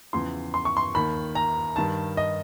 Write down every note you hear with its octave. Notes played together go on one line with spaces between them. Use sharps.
E2 C#3 F3 C6
C6
C#6
C6
D#2 D#3 B5
A#5
G2 D#3 A5
D#5